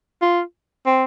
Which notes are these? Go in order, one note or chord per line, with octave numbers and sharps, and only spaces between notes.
F4
C4